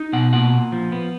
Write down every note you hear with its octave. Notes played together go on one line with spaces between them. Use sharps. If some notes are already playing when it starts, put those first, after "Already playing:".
Already playing: D#4
B2 F#5
A#2 F#5
A#2
F3
B3